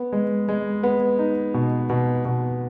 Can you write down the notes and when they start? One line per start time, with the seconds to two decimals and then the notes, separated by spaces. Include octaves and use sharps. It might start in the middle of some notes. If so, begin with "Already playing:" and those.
Already playing: B3
0.12 G#3
0.49 G#3
0.83 B3
1.19 D#4
1.54 B2
1.90 B2
2.25 B2